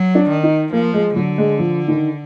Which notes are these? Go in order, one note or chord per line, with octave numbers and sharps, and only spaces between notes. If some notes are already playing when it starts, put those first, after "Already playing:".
Already playing: F#3
D4
D#3
D#4
F3 A#3
G#3
D3 F#3
G#3
F3
D#3